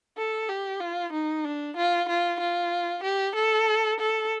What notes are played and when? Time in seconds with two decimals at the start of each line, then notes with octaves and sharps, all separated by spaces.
0.17 A4
0.49 G4
0.80 F4
1.13 D#4
1.44 D4
1.77 F4
2.09 F4
2.40 F4
3.04 G4
3.35 A4
4.00 A4